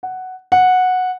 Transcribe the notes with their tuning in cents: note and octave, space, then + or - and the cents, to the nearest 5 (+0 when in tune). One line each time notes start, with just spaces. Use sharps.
F#5 +5
F#5 -10